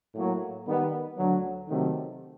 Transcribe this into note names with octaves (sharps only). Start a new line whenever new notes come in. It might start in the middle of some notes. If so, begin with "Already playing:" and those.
A2 F#3 A#3
D#3 G3 B3
D2 D3 F#3
C3 D#3 F#3 A3